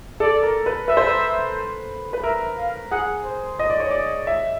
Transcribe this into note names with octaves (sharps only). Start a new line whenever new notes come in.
A4 D5
A#4
B4
B4 E5
C5
B4
B4
A#4 E5
F5
G#4 F#5
C5
D#5
D5
C#5
D5
E5